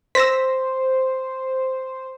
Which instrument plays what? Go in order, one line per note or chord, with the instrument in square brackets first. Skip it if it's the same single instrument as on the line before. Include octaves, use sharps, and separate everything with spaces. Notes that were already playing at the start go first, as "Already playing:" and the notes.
[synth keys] C5 [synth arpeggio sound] E6 A#6 B6